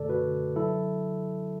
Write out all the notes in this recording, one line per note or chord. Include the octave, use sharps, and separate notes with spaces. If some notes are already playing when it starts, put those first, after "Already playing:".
Already playing: F#2 B2 D3 A3 A4 D5
F#4 B4
D3
F#3 E4 A4